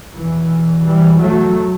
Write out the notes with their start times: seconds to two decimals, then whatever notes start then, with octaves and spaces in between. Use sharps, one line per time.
0.15 E2 B2 E3
0.85 E3 G3
1.20 F#3 A3